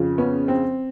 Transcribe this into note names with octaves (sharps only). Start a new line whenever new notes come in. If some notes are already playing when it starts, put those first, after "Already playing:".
Already playing: F2 C#3 F3
B3 C#4
C4